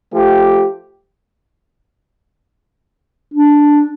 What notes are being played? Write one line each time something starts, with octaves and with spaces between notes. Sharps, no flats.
F3 A3 G4
D4